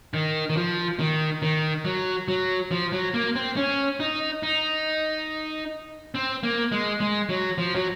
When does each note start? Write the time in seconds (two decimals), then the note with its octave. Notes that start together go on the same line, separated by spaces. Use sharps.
0.14 D#3
0.50 D#3
0.57 F3
0.99 D#3
1.42 D#3
1.85 F#3
2.28 F#3
2.71 F3
2.92 F#3
3.14 A#3
3.35 C4
3.57 C#4
4.00 D#4
4.43 D#4
6.15 C4
6.43 A#3
6.72 G#3
7.00 G#3
7.29 F#3
7.58 F3
7.75 F#3